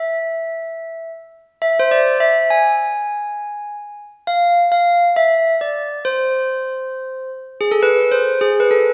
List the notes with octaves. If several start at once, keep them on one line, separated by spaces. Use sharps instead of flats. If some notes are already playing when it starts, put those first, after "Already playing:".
Already playing: E5
E5
C5
D5
E5
G#5
F5
F5
E5
D5
C5
G#4
A4
B4
C5
G#4
B4
A4